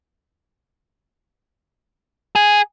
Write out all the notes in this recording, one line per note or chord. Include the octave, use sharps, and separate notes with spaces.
G#4